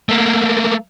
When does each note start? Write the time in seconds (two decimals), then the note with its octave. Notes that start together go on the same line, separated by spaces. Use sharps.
0.09 A3 A#3